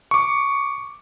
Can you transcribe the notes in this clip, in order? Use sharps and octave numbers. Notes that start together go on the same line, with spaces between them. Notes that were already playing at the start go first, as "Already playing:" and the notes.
C#6 D6